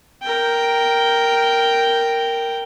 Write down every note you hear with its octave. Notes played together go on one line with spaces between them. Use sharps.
A#4 G5